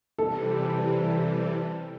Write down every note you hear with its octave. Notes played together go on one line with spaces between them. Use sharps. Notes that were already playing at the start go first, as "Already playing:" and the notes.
C3 E3 G3 A4